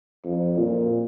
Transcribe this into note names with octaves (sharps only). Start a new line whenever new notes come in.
F2
A#2